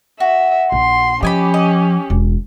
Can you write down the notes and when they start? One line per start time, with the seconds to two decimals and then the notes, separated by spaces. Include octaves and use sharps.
0.20 F#4 E5
0.72 A#1 C6
1.23 F3 C#4 G4 D#5 G#5 B5
1.54 D#5
2.10 E1